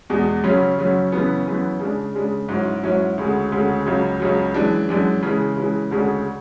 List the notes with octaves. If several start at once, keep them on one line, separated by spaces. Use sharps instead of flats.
E2 B2 G#3
F#2 C#3 F#3 C#4
F#2 C#3 F#3 C#4
F#2 C#3 E3 B3
F#2 C#3 E3 B3
C#3 G#3 D4
C#3 G#3 D4
G#2 F#3 C#4 E4
G#2 F#3 C#4 E4
D2 C#3 G#3
D2 C#3 G#3
C#2 C#3 F#3
C#2 C#3 F#3
F#2 E3 G#3 D4
F#2 E3 G#3 D4
C#3 E3 G#3
C#3 E3 G#3
D2 C#3 G#3 D4